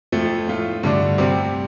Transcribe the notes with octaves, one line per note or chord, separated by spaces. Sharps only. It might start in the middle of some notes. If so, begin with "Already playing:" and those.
F2 F3 A3
A2 A3 F4
G2 D3 A3 D4
C3 G3 C4